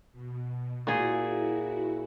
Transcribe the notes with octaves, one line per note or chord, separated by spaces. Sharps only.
B2
A#2 E4 F#4 G#4